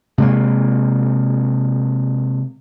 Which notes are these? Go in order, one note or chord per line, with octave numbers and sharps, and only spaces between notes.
C3 G#3 A#3